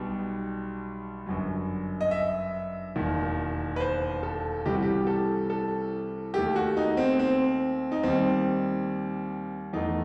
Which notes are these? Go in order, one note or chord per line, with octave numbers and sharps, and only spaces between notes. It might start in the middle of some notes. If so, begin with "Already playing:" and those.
Already playing: B1 B2 G3
G1 F#2 F#3
D#5
E5
E1 D#2 D#3
B4
C5
A4
C2 C3 E3 G3 G4
F#4
G4
A4
A4
D#2 D#3 A3 G4
F#4
D#4
C4
C4
D#4
D#2 D#3 G3 C4
E2 D#3 A3 D#4